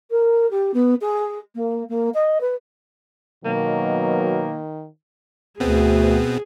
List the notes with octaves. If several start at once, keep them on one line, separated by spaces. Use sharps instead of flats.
A#4
G4
B3
G#4
A#3
A#3
D#5
B4
B2 D#3 F#3 A#3
D2 B2 B3 C4 G#4